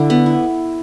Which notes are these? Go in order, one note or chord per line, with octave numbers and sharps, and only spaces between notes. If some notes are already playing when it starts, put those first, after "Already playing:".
Already playing: D3 E4
B3
E4